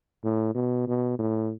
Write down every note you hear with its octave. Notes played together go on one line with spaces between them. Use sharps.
A2
B2
B2
A2